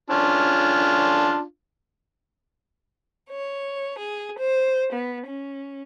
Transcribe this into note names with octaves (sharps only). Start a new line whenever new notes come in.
C#4 D4 F4
C#5
G#4
C5
B3
C#4